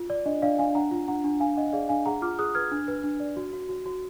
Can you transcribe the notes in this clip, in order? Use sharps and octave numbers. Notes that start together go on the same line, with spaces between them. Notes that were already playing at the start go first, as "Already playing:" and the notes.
Already playing: F4
D5
D4 D#5
D4 D5 F5
D4 F5 G#5
D4 F#5 A#5
F4
D4 F#5 A#5
D4
D4 F5 G#5
D4 D#5 F#5
G#4 D5 F5
D4 F5 G#5
G#4 F#5 A#5
F4 D6 F6
G#4 D#6 F#6
B4 F6 G#6
D4
B4
D4
D5
F#4
F#4
F#4
F#4